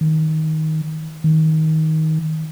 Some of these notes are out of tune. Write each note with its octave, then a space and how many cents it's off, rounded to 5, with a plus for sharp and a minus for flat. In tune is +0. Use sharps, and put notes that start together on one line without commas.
D#3 +15
D#3 +20